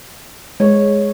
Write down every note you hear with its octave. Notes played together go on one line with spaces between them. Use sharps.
G#3 C#5